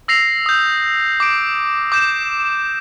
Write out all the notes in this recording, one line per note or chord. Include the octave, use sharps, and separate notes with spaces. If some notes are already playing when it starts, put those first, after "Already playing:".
E6 A#6 C7 F7
D#6 G6
D6 D7
D6 G6 E7